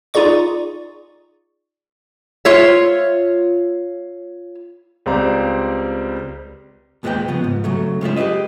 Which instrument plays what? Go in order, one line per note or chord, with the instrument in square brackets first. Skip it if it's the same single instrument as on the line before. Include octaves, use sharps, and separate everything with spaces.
[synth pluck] D#4 F4 G#4 D5 C#6
[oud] F4 C#5 E5
[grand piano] C#2 G3 C4 D5 F5 A#5
[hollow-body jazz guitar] D#2 A#2 G#3 A4 B4 G5
C#3 F3 B3
G#2
C#3 F#3 A3
G#3 C#4 F4 E5
G4 G#4 A#4 B4 D#5